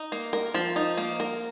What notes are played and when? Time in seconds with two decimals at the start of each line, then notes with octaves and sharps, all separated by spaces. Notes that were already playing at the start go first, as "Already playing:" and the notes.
Already playing: D#4
0.12 A#3
0.33 A#4
0.54 F3
0.76 D#4
0.97 A#3
1.20 A#4